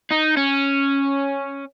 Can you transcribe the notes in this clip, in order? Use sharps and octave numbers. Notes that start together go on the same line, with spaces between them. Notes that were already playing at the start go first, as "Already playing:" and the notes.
D#4
C#4